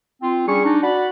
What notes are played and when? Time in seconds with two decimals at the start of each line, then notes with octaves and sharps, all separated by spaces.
0.22 C4 F4
0.47 G3 C#4 D4 G#4 C#6
0.65 D4 D#4
0.83 F#4 D5 F#5 B5